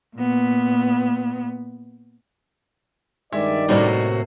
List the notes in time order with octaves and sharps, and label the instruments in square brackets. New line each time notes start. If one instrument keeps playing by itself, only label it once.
[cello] A#2 B3
[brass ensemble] G2 D#3 D5 [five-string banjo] G#3 [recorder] E5
[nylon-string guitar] A2 C3 A#3 [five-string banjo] G3 C#4 D#4 [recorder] F#4